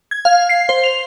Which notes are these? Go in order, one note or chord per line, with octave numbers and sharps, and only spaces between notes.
G#6
F5
C7
C5
F7